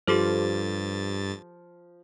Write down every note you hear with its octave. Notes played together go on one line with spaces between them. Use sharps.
G2 F3 G4 A4 C5 A6